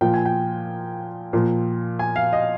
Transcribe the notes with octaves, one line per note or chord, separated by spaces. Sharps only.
A#2 F3 G5
G#5
G5
A#2 F3
G#5
F5
D#5